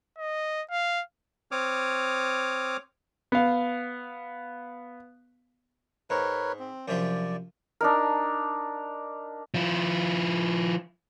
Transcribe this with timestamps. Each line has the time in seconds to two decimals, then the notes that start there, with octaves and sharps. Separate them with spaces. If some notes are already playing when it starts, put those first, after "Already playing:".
0.18 D#5
0.71 F5
1.51 C4 C#5 D6 D#6 F6
3.32 B3 F5
6.10 G#2 A#4 B4 C#5
6.59 C4
6.88 F#2 C3 F3 D5
7.81 D4 D#4 A#4
9.54 F3 E4